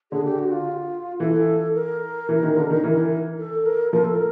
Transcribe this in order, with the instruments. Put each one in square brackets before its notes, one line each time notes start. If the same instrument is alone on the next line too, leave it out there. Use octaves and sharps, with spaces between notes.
[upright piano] D3 [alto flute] G#4
[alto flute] G4
F#4
F4
[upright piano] E3 [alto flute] A4
[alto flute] A#4
[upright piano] E3
D#3
D3
D#3
E3
[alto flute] A4
A#4
[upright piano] F3 [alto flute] A#4
[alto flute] A4
A#4